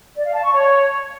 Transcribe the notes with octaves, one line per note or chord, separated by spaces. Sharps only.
D5
F5
A5
C#6
C#5